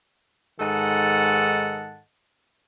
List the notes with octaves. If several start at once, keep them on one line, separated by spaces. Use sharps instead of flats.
G#2 D#3 A4 D#5 F#5 A5